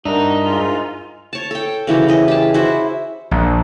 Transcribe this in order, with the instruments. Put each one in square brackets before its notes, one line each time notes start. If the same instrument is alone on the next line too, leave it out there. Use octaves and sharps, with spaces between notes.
[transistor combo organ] G2 E5 [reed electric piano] D4 A#4 [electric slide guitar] D#4 [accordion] F#4
[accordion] G#2 G#3 F4
[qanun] C#5 A5
A4 G5
C#3 E3 F#3 G4
E3 D#5
G4 G#4 A5
E4 F#4 C5
[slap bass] A#1